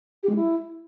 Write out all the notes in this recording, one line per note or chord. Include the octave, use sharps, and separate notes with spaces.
G4
G#3
E4